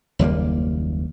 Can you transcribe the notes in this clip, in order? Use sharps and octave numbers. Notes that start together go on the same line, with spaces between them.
F#1 D#2 G3 A#3